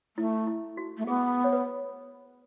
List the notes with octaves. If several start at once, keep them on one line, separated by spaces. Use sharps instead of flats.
A3 E4
E4
F#4
A3
B3 G#4
C#5
B4